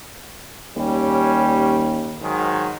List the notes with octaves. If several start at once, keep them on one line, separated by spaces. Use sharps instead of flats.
D#2 G3 C#4
G#2 D#3 F#3